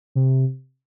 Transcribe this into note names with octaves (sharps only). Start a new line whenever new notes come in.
C3